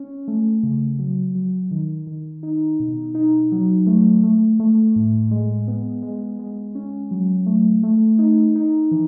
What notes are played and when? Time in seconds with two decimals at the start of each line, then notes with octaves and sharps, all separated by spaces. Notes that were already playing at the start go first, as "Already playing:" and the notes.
Already playing: C#4
0.28 A3
0.63 C#3
0.99 F#3
1.35 F#3
1.71 D#3
2.07 D#3
2.43 D#4
2.80 B2
3.15 D#4
3.52 F#3
3.87 A3
4.24 A3
4.60 A3
4.96 A2
5.31 G#3
5.68 B3
6.03 G#3
6.39 G#3
6.75 C#4
7.11 F#3
7.46 A3
7.83 A3
8.19 D#4
8.55 D#4
8.91 E3